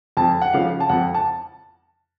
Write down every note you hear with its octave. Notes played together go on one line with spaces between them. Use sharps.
F2 A5
F#5
C#3 F3 F5
A5
F2 F#5
A5